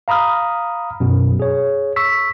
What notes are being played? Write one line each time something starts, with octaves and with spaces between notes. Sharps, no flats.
F5 A#5 B5 D#6 F6
F#2 B2
G#4 C#5
C#6 E6 B6